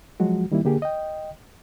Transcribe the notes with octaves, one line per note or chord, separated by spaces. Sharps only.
F3 F#3 G#3 F#4
D#3 G3 A#3 E4
D3 A#3 G4 G#4
D#5 G5